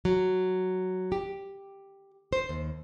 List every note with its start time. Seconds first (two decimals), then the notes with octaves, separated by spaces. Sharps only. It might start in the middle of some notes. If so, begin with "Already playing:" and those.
0.05 F#3
1.12 G4
2.33 C5
2.49 D#2